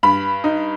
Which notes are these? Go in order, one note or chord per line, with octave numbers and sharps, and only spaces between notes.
G2 B5
D#4